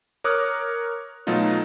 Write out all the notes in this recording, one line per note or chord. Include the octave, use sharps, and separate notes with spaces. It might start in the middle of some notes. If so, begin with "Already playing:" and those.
A#4 C#5 D6 D#6 F6 F#6
B2 F#3 A3 D#4 F4